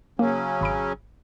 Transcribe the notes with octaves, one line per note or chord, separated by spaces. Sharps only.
C#3 F#3 A#3 C#4
G#1 B5 D7